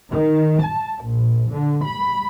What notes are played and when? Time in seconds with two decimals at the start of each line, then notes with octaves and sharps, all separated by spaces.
0.11 D#3
0.63 A5
1.04 A#1
1.51 D3
1.85 B5